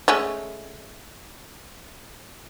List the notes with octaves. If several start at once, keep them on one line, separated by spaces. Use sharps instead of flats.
G#3 A3 C#4